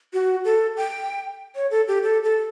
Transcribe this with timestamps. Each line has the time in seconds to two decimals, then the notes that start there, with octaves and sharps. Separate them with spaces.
0.14 F#4
0.45 A4
0.77 G5
1.55 C#5
1.71 A4
1.88 G4
2.03 A4
2.23 A4